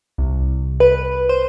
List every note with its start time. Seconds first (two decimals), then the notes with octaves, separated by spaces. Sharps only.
0.18 C2
0.80 B4
1.29 C5